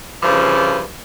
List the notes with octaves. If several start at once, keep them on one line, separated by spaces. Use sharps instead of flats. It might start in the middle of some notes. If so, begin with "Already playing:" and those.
G2 C#3 E3 F3